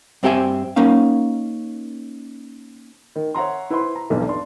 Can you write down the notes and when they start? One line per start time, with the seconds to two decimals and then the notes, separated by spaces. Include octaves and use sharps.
0.23 G2 C4 G4 A4 E5 G#5
0.76 A#3 C#4 D#4 F5
3.16 D#3
3.35 C#5 E5 F#5 A#5 C6
3.70 E4 B4 C5 E5 B5 C6
3.96 A#5
4.10 F1 B1 E2 G2
4.28 D4 C6